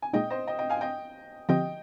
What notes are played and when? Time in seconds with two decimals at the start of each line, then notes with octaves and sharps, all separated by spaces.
0.02 G#5
0.13 A#2 G#3 D#4 D#5 G5
0.30 C5 D#5
0.47 D#5 G5
0.59 D#5 G5
0.70 F5 G#5
0.81 D#5 G5
1.49 D3 F3 C4 G4 D#5 G5